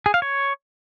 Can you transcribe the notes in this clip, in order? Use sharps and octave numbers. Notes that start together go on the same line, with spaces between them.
G#4
F5
C#5